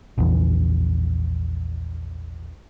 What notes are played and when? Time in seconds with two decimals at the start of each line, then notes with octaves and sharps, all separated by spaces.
0.18 A#1 E2